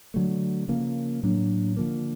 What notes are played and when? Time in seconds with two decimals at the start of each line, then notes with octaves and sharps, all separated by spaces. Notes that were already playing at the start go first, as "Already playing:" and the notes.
0.14 D3 F#3 A3
0.68 C#3 F3 A#3
1.23 A2 F#3 A#3 D4
1.77 D3 F3 A#3